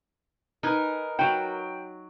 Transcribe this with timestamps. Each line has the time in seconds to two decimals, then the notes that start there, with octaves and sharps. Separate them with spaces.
0.63 D#4 A#4 B4 G#5
1.19 F#3 F#4 G5